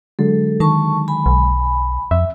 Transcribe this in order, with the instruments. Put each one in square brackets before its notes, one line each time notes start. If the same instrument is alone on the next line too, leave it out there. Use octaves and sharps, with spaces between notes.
[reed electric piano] D3 F#3 G#3 [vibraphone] A4
[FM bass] D#3 [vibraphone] A5 C#6
[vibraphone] G#5 B5
[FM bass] B1
[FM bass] F2 [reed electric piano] E5